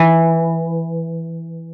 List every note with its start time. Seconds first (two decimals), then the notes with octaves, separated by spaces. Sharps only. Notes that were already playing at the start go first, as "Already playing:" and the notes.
Already playing: E3